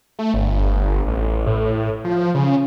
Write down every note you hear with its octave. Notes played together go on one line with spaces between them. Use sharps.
A3
G1
A1
A2
F3
C#3